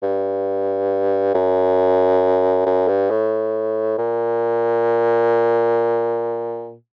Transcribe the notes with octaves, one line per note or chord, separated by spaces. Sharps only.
G2
F#2
F#2
G2
A2
A#2